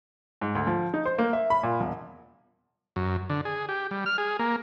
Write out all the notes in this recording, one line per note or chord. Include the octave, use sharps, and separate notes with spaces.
G#2
D2
F3
D#4
C5
A#3
E5
B5
A#2
E1
F#2
D3
G#4
G4
G3
F6
G#4
A#3